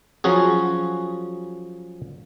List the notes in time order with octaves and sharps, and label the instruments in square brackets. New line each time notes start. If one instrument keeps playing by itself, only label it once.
[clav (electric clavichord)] F3 F#3 C#4 F#4 G#4